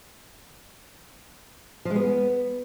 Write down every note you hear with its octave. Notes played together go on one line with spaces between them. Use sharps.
F3
G#3
B3